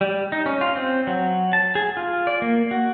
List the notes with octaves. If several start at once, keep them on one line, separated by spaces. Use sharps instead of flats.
G3
D#4
C#4
F4
C4
F#3
A5
G#4
F4
D5
A#3
F#4